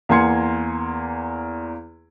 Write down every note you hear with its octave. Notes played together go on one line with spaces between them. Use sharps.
E2 A#3 G#5 C6 G#6 C#7